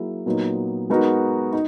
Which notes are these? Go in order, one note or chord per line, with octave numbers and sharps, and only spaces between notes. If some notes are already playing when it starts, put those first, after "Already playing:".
Already playing: F#3 A#3 E4 G#4
A#2 F#3 B3 D#4
G#3 B3 D#4 F#4 A#4
D#4